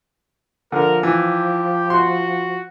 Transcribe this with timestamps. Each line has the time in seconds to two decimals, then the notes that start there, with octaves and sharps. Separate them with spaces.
0.72 D3 F3 A#4
1.03 E3 G4
1.90 F#4 C6